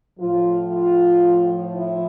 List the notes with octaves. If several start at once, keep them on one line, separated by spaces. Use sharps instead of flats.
A2 F3 F4
F4
E4